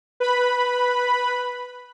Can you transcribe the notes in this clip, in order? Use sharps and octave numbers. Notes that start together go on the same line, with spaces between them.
B4 B5